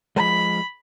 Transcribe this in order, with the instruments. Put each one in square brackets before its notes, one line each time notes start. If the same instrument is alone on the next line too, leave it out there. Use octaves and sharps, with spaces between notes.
[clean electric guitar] F3 G#3 [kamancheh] B5